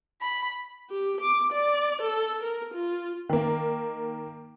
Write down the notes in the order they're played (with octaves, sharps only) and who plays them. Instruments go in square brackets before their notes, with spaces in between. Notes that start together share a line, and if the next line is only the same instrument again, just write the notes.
[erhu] B5
[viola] G4
D6
D5
A4
A#4
F4
[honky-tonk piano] D#3 A#3